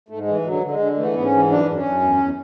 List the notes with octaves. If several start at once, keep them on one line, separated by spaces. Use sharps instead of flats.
G#2 A3
G#3
E3
G#3
D3 F#3
D3
G#3
D3
E3 A3
G#2 B3
C#4
E3
F#2 D4
F#2
C#4
F#2
E2
E2